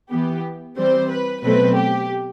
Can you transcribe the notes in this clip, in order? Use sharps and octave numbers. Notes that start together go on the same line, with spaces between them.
E3 B3 G4
E3 G3 C4 C5
B4
B2 F#3 A3 C4 B4
G4